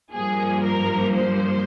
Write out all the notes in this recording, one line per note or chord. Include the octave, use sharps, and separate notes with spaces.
G2 F3 A#3 G#4
A#4
C5